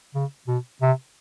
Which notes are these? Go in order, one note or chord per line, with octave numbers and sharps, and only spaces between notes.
C#3
B2
C3